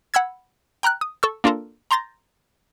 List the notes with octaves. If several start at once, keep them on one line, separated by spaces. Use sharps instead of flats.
F#5 B5 E6 G#6
G5 A#5 F6 F#6
D#6
A4 C#6 E6
A#3 D4 F4 A4 A#4
A#5 C6 G6 A6 A#6